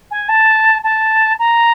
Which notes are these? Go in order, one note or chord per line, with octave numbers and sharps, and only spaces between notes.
G#5
A5
A5
A#5